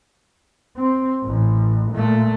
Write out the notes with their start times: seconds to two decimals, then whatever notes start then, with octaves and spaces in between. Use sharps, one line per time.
0.76 C4
1.24 A1
1.92 A#2 A3